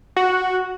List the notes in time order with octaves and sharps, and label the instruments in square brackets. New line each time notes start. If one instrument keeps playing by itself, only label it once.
[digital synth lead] F#4